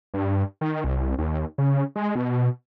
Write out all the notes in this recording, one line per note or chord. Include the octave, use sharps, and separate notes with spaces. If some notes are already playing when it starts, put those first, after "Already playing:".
G2
D#3
C2
D#2
C#3
G#3
B2